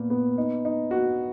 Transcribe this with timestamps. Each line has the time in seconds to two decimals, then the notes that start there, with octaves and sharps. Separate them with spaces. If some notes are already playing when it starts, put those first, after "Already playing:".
Already playing: A#2 B3
0.10 B3
0.38 D#4
0.65 D#4
0.91 F#4